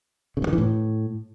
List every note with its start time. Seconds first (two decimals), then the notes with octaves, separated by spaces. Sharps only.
0.37 C#3
0.42 G2
0.47 D#3
0.53 E3
0.58 A2